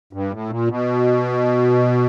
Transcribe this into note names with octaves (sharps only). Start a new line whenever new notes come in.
G2
A2
A#2
B2